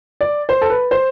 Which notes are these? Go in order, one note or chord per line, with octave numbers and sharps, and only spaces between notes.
D5
C5
A4
B4
C5